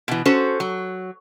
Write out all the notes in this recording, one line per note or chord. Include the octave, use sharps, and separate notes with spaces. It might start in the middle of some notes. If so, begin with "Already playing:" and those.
B2 E3
C#4 F#4 A4 C5
F#3